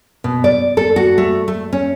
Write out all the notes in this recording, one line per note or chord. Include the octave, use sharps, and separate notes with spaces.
B2
D5
A4
F#4
A3
A3
C#4